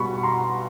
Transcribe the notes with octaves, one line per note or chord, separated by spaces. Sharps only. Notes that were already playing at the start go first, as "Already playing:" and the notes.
Already playing: B2 G3 B3 B5 C#6
B5
A#5 C6